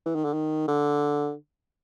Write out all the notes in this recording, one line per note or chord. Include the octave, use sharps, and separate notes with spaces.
E3
D#3
D3
D#3
D3